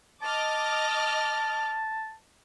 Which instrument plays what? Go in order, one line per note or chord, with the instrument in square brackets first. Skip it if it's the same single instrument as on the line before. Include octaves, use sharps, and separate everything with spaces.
[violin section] D#5 D6 F6 [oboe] A5